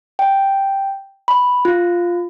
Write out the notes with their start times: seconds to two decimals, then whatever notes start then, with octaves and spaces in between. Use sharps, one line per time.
0.19 G5
1.28 B5
1.65 F4